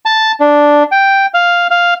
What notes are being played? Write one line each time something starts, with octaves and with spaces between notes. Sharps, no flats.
A5
D4
G5
F5
F5